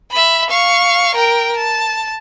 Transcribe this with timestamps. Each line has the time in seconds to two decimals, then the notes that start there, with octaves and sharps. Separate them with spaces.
0.11 E5 B5
0.50 F5 C#6
1.15 A#4 G5
1.57 A5